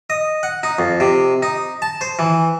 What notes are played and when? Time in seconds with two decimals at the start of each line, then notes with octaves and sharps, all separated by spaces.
0.10 D#5
0.43 F#5
0.63 D#4
0.79 F2
1.00 C3
1.43 D#4
1.82 A5
2.01 C5
2.19 E3